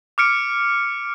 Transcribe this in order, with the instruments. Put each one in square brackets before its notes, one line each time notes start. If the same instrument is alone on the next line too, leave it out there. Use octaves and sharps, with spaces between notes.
[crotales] D6 F6 C#7 D7